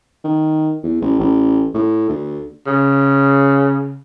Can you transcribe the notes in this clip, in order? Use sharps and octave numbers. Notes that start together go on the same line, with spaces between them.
D#3
E2
A1
A1
A2
D2
C#3